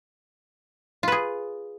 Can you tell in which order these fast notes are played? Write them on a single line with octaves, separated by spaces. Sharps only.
F4 B4 G#4